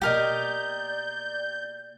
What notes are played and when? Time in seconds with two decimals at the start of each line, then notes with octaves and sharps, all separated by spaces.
0.01 B2 A#3 G4 A#4 D5 D#5 G6